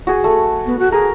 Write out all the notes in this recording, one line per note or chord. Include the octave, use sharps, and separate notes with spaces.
F#4 G#4
A3
B3
F#4
G#4 A#4